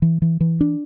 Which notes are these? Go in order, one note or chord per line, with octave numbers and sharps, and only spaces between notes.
E3
E3
E3
D4